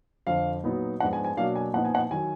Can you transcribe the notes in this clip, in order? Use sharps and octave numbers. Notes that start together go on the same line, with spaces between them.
F2 D3 F3 F5
A#2 F#3 B3 D#4
G#2 F3 B3 D4 F#5
G#5
G#5
B2 F#3 A#3 D4 F5
G#5
A#2 F3 B3 D#4 F#5
G#5
F#5
D#3 F#3 G#5